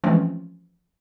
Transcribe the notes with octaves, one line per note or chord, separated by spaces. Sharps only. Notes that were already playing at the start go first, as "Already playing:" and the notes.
E3 F3 G#3 A3 C4 C#4